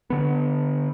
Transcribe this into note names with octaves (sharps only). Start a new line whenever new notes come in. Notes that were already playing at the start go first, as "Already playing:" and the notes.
D3 B3